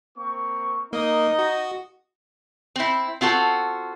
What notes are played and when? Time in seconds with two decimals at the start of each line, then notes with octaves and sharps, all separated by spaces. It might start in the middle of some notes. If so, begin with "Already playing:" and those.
0.17 A#3 C4 C#6
0.93 A#3 D#4 D#5
1.39 F#4
2.76 C4 E4
3.21 C4 F4 F#4 A4